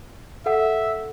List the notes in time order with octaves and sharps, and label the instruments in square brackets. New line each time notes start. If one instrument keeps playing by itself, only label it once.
[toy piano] A4 F#5 [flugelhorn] E5